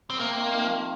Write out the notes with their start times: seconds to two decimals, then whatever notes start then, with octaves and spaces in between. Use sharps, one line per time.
0.10 C4
0.19 C3 A#3
0.38 D#3
0.57 F3
0.77 D#3